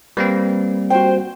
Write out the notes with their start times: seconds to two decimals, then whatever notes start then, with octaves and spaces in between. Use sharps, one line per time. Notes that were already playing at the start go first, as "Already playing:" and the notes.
0.17 G3 A#3 C4 B4
0.90 F#4 C5 G5